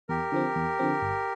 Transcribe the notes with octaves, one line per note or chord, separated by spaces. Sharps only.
E2 G4 A#4
D3 F3 C4
E2
D3 F3 C4
G1